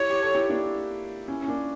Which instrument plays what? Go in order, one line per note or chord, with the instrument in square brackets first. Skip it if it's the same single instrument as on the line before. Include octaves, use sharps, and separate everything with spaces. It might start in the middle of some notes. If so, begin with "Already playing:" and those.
Already playing: [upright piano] E4 G4 [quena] C#5
[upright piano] G4
A4
E4 G4
A#3 D4
C#4 E4
C#4
A#3 D4